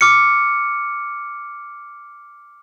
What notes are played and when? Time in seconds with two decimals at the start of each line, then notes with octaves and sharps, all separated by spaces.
0.01 D6 F6 C#7